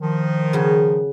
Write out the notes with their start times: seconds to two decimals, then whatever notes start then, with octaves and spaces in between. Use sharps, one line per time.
0.01 D#3 F3
0.53 C#3 F#4